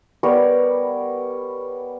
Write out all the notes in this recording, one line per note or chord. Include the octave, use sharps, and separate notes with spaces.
G3 B3 A#4 C#5